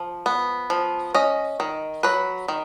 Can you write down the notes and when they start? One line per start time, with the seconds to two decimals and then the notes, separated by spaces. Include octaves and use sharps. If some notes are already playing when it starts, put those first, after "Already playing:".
Already playing: F3
0.26 B3
0.70 F3
1.14 C#4 D#5
1.60 D#3
2.03 F#3 B4
2.48 D#3